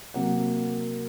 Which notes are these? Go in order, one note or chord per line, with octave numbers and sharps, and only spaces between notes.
C3 F#3 A#3 F#5